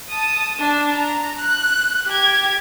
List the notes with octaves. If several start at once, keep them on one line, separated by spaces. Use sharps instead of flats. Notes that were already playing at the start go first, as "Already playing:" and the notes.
A5 D#6
D4
A#5
F#6
G4 G#6